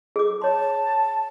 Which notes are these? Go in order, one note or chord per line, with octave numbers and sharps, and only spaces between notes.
G#4 D6
C#5 A5 C6